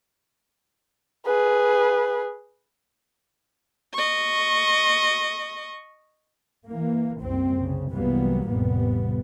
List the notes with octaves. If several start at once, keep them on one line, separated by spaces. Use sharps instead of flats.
G#4 B4
D#5 C#6
E3 A#3
F#1 C2 F#2 C4
C2 C#3
C2 E3 F#3 G3 A#3 B3
A1 F2 C3 G3 B3